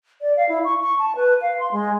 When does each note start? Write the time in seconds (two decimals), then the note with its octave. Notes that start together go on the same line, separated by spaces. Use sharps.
0.21 D5
0.37 F5
0.49 E4
0.64 C#6
0.80 C#6
0.99 A5
1.16 B4
1.42 F5
1.60 C6
1.72 G#3